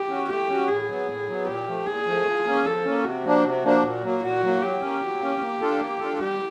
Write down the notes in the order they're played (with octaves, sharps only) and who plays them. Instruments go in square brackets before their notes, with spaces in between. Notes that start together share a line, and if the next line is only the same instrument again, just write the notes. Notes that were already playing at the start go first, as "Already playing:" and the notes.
Already playing: [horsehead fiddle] G4
[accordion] C#4 F#4
[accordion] A3 [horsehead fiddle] G4
[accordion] C#4 F#4
[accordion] A2 [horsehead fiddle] G#4
[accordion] F#3 B3
A2
F#3 B3
[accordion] A#2 [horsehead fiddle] G4
[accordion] F3 A3
[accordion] A#2 [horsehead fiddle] G#4
[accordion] F3 A3
F3
A#3 C#4
[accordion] F3 [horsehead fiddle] A4
[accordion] A#3 C#4
[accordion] C3 [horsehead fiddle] F#4
[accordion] F3 A#3 D4
C3
F3 A#3 D4
A#2
F#3 A#3
[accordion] A#2 [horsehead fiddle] F#4
[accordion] F#3 A#3
[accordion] F#3 [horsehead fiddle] G4
[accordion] A#3 C#4
F#3
A#3 C#4
A#3
D4 F4 A4
A#3
D4 F4 A4
[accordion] G3 [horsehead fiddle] G4